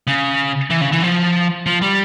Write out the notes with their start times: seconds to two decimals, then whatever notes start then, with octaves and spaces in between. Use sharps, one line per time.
0.07 C#3
0.70 E3
0.81 C#3
0.92 E3
1.02 F3
1.66 F3
1.82 G3